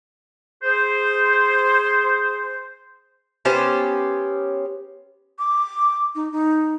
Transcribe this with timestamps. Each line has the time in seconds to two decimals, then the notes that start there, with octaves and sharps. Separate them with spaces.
0.63 G#4 C5
3.45 B3 C#4 G4 C5
5.39 D6
6.15 D#4
6.32 D#4